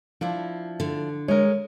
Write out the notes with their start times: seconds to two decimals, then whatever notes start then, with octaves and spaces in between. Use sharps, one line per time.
0.21 F3 D4 E4
0.80 D3
1.28 G#3 A#4 C#5